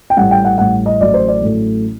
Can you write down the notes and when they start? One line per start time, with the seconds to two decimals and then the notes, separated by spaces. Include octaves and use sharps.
0.10 G5
0.17 A1 A2 G3 F#5
0.31 G5
0.45 F#5
0.58 A1 A2 G3 F#5
0.86 D#5
1.01 A1 A2 F#3 A3 D5
1.14 C5
1.28 D5
1.42 A1 A2 F#3 A3